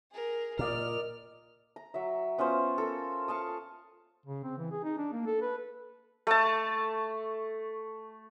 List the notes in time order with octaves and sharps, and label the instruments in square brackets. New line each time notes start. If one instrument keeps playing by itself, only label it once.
[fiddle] G#4 A#4
[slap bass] A#2 [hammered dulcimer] A#4 D5 D#5 [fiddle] F6
[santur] A#5
F#3 E5
B3 C#4 F4 C5
A4 A#4
F5 A5 C#6 D#6
[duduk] C#3
C4
E3
G#4
D#4
D4
A#3
A4
B4
[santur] A3 A5